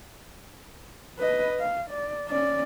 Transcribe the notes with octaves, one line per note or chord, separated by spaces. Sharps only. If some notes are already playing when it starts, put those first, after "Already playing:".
B4 D#5
F5
D5
C#4 D5